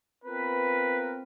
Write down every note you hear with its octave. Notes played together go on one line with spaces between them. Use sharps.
B3 C4 F4 A#4 B4